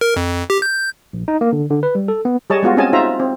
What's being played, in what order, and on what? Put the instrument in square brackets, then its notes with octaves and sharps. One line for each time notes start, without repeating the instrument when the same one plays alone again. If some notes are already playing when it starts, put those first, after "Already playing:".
[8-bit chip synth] A#4
F2
G4
G6
[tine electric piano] A#1
D#4
A#3
D3
D3
B4
G3
A4
B3
[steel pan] G3 G#4 C#5 D#5 A5
G#3 B3 F4 F#4
C4 C#4 G#4 D#5 G#5 A5
D#4 F4 C5 E5 A#5
C4